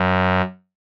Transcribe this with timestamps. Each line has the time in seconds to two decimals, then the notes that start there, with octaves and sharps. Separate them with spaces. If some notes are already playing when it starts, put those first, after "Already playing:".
Already playing: F#2